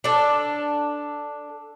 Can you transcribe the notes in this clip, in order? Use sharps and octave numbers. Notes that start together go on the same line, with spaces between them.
D4 A4